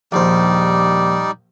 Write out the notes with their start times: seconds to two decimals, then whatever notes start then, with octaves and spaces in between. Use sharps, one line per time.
0.12 A#1 D#2 G3 D#4 C5 D5